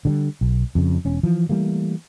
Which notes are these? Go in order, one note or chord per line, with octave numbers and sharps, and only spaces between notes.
D3 F#3 G3
B1
F2 C#3
E1 C#4
E3 F3
E3 G3 A3 A#3